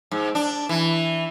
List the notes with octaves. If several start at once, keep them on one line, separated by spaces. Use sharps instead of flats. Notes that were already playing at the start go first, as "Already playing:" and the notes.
G#2
D4
E3